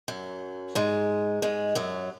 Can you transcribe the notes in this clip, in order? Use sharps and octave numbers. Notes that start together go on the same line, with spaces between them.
F#2 F#3
G#2 G#3
G#2 G#3
F#2 F#3